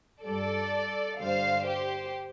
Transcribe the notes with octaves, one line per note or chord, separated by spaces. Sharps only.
G2 G3 A4 D5
G2 D3 G3 C5 F5
G4 C5